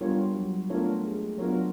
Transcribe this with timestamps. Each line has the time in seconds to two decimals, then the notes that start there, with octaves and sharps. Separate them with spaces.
0.01 G3 B3 D4 F4 A#4 C#5
0.35 F#3
0.70 A3 B3 D4 F4 A#4 C#5
1.04 G#3
1.38 F#3 B3 D4 F4 A#4 C#5